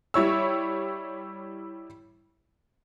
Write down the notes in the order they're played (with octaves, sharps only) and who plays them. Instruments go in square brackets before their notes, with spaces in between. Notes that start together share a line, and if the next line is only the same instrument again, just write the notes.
[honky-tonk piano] G3 E4 C#5 E6